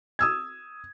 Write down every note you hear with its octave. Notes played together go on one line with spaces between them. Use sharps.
D#6 E6 G#6